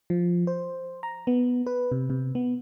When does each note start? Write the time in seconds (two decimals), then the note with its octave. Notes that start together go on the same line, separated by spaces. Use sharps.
0.10 F3
0.47 C5
1.03 A#5
1.27 B3
1.67 B4
1.92 C3
2.10 C3
2.35 B3